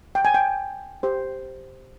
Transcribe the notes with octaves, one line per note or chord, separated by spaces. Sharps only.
G5
G#5
G5
G4 C5